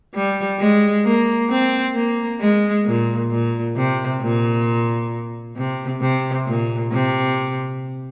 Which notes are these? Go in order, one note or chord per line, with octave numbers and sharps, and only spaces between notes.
G3
G#3
A#3
C4
A#3
G#3
A#2
A#2
C3
A#2
C3
C3
A#2
C3